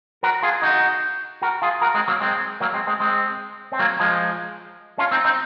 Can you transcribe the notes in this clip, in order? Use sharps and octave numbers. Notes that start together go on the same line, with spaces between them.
F#4 A#4
F4 G#4
D#4 F#4
F#4 A#4
F4 G#4
F#4 A#4
G#3 C4
F#3 A#3
G#3 C4
F#3 A#3
G#3 C4
G#3 C4
G#3 C4
C4
F#3 A#3
F3 G#3
C#4 F4
C4 D#4
C4 D#4